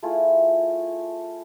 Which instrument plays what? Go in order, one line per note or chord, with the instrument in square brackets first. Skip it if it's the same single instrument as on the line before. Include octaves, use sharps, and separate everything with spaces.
[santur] A3 E4 F4 G#4